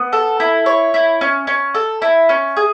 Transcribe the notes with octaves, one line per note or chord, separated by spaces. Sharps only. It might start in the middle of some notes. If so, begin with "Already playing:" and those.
Already playing: B3
A4
E4
C#5
E4
C#4
C#4
A4
E4
C#4
G#4